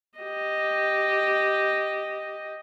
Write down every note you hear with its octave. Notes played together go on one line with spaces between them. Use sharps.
G4 D#5